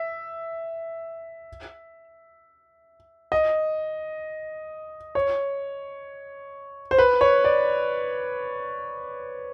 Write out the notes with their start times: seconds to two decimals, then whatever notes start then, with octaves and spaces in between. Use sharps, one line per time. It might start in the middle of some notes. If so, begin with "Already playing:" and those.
Already playing: E5
3.32 D#5
5.15 C#5
6.91 C5
6.98 B4
7.21 C#5
7.44 D5